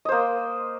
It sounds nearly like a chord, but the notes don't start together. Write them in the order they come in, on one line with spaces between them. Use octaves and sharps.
D#5 C5 A#3